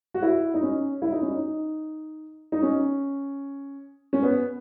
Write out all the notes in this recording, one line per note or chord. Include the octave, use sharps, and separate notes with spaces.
F#4
E4
D#4
C#4
E4
D#4
C#4
D#4
D#4
C#4
C#4
B3